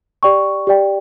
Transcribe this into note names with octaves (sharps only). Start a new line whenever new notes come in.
G4 D5 G5 C#6
G4 D5 G5